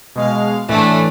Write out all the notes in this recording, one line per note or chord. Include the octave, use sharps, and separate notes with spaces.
B2 G#3 F5
A2 E3 A3 D4